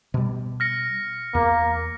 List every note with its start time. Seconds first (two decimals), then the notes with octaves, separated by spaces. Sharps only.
0.14 B2 G3
0.60 F6 A#6 C#7
1.35 E2 A#3